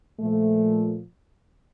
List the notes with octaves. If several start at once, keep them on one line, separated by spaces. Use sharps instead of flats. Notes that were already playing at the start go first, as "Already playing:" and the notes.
A#2 F3 A3